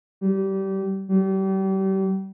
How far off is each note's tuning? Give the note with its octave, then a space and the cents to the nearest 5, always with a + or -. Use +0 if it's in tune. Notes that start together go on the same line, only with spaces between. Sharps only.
G3 -25
G3 -35